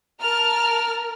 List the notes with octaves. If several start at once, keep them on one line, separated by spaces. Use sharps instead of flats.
A#4 A5 F6